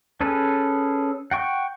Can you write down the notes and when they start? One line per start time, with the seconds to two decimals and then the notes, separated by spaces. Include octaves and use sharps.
0.21 C#4 G#4 A4 B4
1.31 F#5 G5 C#6